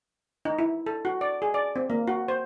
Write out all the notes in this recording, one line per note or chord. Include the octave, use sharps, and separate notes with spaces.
D#4
E4
A4
F#4
D5
G#4
D5
C4
A#3
F#4
C5